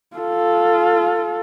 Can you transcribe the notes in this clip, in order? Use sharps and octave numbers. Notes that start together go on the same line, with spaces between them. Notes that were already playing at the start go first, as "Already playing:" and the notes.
F4 A4